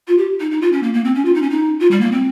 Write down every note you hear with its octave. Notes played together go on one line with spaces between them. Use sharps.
F4
G4
D#4
D#4
F4
C#4
A#3
A#3
C4
C#4
F4
D#4
C#4
D#4
F4
G3
A#3
C4